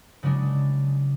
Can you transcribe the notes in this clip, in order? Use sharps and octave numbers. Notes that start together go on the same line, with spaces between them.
C#3 F#3 G#3 D4